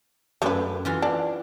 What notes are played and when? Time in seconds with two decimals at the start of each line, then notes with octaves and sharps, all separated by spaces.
0.42 F#2 A3 D4 B4
0.85 E3 F4 F#4
1.02 D4